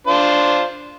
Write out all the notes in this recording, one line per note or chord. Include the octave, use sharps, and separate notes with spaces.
D4 F4 C5